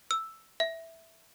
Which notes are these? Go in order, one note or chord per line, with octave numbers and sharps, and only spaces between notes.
E6
E5